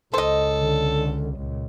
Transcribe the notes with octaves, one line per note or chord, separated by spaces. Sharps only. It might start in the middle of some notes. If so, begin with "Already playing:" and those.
C#2 C#3 A4 C5 D#5
D3
C#2 A#2